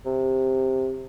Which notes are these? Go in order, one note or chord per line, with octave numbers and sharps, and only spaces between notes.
C3